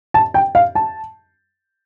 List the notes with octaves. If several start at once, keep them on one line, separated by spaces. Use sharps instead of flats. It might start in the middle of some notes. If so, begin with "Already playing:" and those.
A5
G5
F5
A5